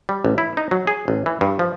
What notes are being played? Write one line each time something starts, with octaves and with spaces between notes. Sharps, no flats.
G3
A1
E4
D#4
F#3
G#4
A1
E3
G2
F3